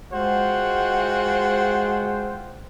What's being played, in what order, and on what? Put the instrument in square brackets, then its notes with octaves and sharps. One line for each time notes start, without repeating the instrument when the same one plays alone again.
[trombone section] G#3 G#4 [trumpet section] F4 F#5 G5 [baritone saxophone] F#4 [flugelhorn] C5